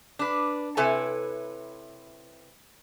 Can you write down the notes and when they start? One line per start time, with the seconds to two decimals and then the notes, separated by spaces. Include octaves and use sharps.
0.19 D4 B4
0.77 C3 E4 A4 B4 C#5 G#5